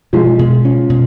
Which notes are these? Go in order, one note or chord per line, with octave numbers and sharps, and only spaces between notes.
B2 F3 G#3
B2
C#4
B2